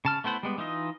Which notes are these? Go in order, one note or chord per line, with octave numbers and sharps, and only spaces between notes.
C#3 A5 F6
A3 B3 E4 C5 F#5
G3 G#3 B3
E3 D#4 F4 D#5